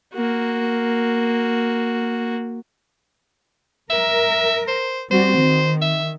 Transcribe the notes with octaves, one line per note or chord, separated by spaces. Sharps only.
A#3 F#4
A#4 E5
C5
G3 C4 F#4 C5
D#3
E5